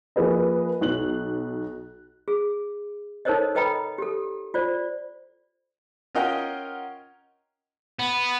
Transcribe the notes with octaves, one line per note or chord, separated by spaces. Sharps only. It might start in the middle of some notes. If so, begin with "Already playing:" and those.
F3 A#3 G#4 B4 D#5
B1 F#6 F#7
G#4
D#4 A4 A#4 C5 C#5 D#5
A4 B4 D#5 G5 A#5 B5
G4 A4
F4 C5 D5
C#4 F4 A#4 D#5 F#5 G5
B3